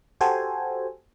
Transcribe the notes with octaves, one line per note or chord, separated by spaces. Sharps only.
F#4 G4 A4 C5 G#5